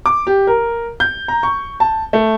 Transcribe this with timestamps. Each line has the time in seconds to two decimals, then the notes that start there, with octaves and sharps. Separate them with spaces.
0.06 D6
0.27 G4
0.47 A#4
1.00 G6
1.28 A#5
1.43 C#6
1.80 A5
2.13 A3